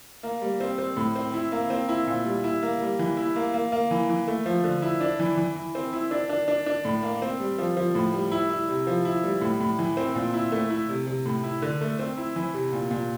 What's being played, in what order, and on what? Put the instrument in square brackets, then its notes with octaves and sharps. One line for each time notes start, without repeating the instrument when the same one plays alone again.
[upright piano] A#3
G3
C4
C4
A2
C4
E4
A#3
C4
E4
A#2
G3
E4
A#3
G3
E3
E4
A#3
A#3
A#3
E3
E3
A3
F3
D3
E4
D4
E3
E3
E3
C4
E4
D4
D4
D4
D4
A2
A#3
C4
G3
F3
F3
A2
G3
E4
E4
C3
F3
E4
G3
A2
A2
E3
C4
A#2
E4
A3
E4
C3
C3
A2
E4
D3
A3
C4
E4
E3
C3
A#2
A#2